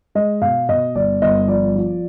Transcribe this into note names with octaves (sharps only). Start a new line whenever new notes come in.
G#3 D#5
B2 F5
B2 D#5
G1 D5
G1 D#5
F3 D5
F3